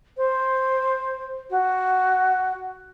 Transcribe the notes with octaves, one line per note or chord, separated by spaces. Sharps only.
C5
F#4